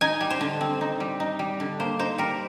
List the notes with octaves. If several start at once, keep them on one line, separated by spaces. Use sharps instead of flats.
D#4 G#5
G3
C5
D3
C4
D#4
G3
D#4
G3
D3
A#3 C5
D#4 C5
G3 A#4